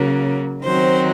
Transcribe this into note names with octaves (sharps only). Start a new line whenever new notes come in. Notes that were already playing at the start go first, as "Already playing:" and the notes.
Already playing: C#3 F#3 A#3
D#3 F#3 C4 C5